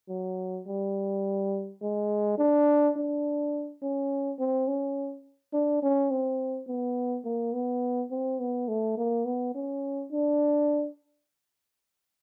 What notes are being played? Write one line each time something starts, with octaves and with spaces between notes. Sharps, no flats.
F#3
G3
G#3
D4
D4
C#4
C4
C#4
D4
C#4
C4
B3
A#3
B3
C4
B3
A3
A#3
B3
C#4
D4